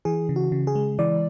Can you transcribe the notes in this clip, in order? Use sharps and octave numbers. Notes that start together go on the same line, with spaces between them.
E3 G#4
C#3
F#4
C#3
G#4
G#3
E3 D5